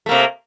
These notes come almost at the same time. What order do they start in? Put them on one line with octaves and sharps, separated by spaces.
A3 A#3 C3